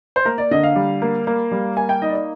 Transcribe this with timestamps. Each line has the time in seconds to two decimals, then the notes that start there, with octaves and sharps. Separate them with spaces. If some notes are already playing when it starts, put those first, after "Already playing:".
0.16 C5
0.25 A#3 A#4
0.38 D5
0.51 D3 D#5
0.63 F5
0.76 G3
1.02 A#3
1.27 A#3
1.51 G3
1.76 A#3 G#5
1.89 G5
2.02 D#4 D#5
2.09 D5
2.15 D#5